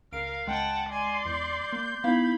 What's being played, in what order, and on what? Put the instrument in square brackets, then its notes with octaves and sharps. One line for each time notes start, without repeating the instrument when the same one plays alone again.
[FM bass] C#2 [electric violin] A#4 F5 [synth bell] D7
[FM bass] C#2 [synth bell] G#3 [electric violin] F#5 A5 [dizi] G5
[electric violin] D5 C6 [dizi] G#5
[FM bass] E2 [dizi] G6
[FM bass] A#3
[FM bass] B3 [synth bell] D#4 E4 F5 [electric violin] B5